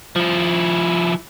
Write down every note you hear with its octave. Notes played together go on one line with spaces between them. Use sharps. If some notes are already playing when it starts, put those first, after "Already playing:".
F3 E4